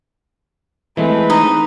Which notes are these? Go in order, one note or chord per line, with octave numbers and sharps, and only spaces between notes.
E3 G#3 A3 C4 B4
D#4